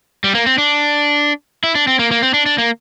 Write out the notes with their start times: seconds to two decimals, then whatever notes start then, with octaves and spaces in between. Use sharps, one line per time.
0.24 G3
0.35 A#3
0.46 C4
0.58 D4
1.64 E4
1.75 D4
1.87 C4
1.99 A#3
2.11 A#3
2.23 C4
2.34 D4
2.46 D4
2.58 A#3